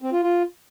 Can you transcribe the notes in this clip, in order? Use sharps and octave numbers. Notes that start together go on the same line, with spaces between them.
C4
F4
F4